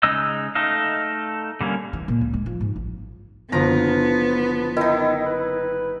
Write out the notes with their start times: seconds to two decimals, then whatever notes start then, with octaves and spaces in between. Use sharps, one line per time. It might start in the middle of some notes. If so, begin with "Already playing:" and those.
0.03 C#3 G#3 D#4 D#5 E6
0.55 A3 D#4 A4 D#5 F5
1.61 D3 G3 A#3 C#4
1.93 E3
2.08 A#2
2.21 C#2
2.34 G#3
2.46 F3
2.61 G#2
2.76 A1
3.52 F#1 D3 F3 F#3 B3 A#5
4.77 D#3 D#4 E4
5.26 B4